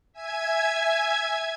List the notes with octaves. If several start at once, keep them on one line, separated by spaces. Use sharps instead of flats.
E5 G#5 G#6